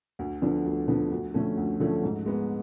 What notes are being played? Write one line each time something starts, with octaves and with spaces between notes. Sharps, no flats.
D2
D3 F3 B3 D4
D2
D3 F3 B3 D4
D2
D3 F3 A3 C#4
D2
D3 F3 A3 C#4
G#2
G#3 B3